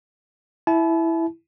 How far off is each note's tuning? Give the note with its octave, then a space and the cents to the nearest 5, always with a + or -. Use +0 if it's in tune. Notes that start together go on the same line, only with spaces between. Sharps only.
E4 +0 A5 -40